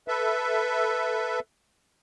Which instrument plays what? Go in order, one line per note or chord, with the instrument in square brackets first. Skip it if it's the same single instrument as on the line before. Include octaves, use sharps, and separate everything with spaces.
[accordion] A4 B4 E5